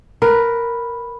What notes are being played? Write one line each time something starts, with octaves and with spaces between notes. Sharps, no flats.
A#4 B4